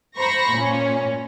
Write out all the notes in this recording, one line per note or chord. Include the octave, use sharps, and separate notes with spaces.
C5 A#5 B5 C#6 A#6
A#2 C#4